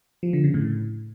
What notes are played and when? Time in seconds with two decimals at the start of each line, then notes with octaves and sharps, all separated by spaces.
0.23 F3
0.33 D3
0.44 C#3
0.54 A2